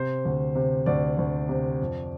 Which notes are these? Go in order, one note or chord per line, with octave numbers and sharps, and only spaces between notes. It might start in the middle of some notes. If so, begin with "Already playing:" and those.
Already playing: C3 C5
D2
C3
D2 D5
D2
C3
F2